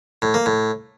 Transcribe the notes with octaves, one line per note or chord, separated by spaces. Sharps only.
A2
A#3
A2